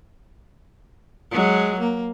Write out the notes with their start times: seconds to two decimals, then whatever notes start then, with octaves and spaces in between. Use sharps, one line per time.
1.31 F#3 G#3
1.80 A#3